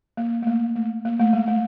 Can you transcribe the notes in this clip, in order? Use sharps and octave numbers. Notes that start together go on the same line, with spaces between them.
A#3
A3
A#3
A3
A#3
A3
G#3
A3